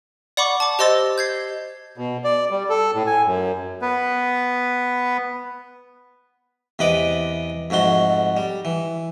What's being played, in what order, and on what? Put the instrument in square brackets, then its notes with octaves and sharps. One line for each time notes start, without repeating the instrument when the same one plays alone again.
[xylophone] D5 F#5 B5 C#6 D6
A5 D6
G4 C5 D#5 C6 E6 A6
G6 G#6 C7
[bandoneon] B2
D5
G3
A4
A2
G#5
F#2
[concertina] B3 B4
[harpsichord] E2 C3 B4 D#5 B5 D6
F2 G#2 A3 F#4 C6
G3
E3